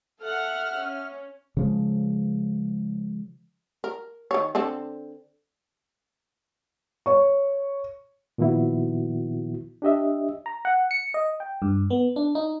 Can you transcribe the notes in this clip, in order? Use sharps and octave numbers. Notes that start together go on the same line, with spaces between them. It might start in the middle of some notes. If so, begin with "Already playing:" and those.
A4 E5 F#5 F6
C#4
C#3 F3 G#3
A#4
D#3 C#5
D3 C4 A4
C#5 C#6
A#2 D#3 F3 B3 E4 F#4
D4 G4 D#5 E5
A#5
F#5
C#7
D#5
G5
G2
B3
D4
D#4